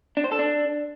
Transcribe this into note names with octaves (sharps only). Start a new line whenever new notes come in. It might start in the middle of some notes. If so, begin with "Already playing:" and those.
D4
C5
A4
D4